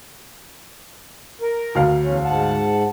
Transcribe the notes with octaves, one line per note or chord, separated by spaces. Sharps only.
A#4
D2 F5
E2 C#4
G#2 F#5 A5